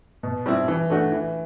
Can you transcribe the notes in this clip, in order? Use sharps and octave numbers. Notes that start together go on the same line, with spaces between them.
B2
G3 C4 E4
E3
A3 D4 F#4
E3